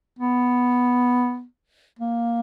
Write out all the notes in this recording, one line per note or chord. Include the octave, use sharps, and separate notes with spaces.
B3
A#3